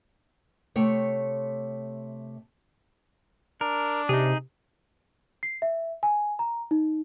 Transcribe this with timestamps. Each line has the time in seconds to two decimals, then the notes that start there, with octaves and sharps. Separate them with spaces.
0.76 C3 A3 C#5 G5
3.61 D4 A#4
4.09 C3 D#4 G#4
5.43 C7
5.62 E5
6.03 G#5
6.39 A#5
6.71 D#4